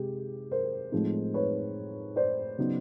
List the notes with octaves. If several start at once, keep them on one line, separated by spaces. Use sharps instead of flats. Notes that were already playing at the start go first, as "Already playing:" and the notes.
Already playing: C3 G#3 G4
A#4 C5
A2 F3 G#3 C4 D#4
B4 C#5
C5 D5
C#3 F#3 B3 D#4